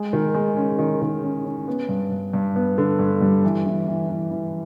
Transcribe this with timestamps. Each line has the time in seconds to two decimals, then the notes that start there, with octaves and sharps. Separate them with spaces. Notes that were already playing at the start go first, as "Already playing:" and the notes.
Already playing: G#3
0.13 D#3
0.35 G#3
0.57 C#4
0.79 D#3
1.02 D#3
1.23 C#4
1.45 C#4
1.68 B3
1.89 G2
2.11 G2
2.33 G2
2.56 B3
2.78 D3
2.99 G2
3.21 G3
3.44 E3
3.66 E3
3.88 E3
4.10 E3
4.31 E3